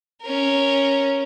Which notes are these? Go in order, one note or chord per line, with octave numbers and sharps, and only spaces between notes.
C#4 A#4